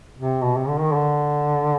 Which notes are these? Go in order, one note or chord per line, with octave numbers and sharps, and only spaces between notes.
C3
B2
C3
D3
D#3
D3